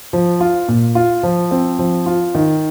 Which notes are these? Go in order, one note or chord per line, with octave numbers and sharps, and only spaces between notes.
F3
F4
A#2
F4
F3
C4
F3
F4
D#3